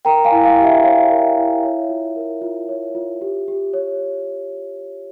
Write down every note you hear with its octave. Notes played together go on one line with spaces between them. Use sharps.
A#4 G5 A#5
F5 G#5
E4
F5
G4
E5
C#5 F5
E5
A#4
E5
E4
C#5
F4
A#4
F4
C#5
F4
G4
G4
C#5